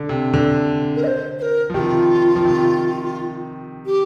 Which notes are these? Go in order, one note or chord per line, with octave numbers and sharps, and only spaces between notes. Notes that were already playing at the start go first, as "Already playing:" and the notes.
Already playing: D3
C3
D3
A#4
D#5
C5
C5
A#4
F3
C3 D#3 F4 G4
F3
C3 D#3
G4